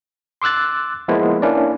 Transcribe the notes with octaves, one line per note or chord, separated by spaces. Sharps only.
C6 D6 E6 F#6 A6
F3 G#3 A#3 B3 E4 F4
A#3 C#4 D4 E4 D5